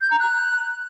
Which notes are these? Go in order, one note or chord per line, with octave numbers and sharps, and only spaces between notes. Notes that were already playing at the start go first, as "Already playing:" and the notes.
G6
A#5
F#6